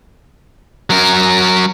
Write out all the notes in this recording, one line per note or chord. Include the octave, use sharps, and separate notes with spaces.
F#3 A#4